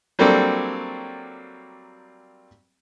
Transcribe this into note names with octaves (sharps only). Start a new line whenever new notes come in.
F#3 G3 A#3 C4 D4 A4